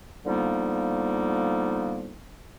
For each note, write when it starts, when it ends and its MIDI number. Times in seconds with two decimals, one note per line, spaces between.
0.25 2.14 50
0.25 2.14 53
0.25 2.14 55
0.25 2.14 58
0.25 2.14 59
0.25 2.14 63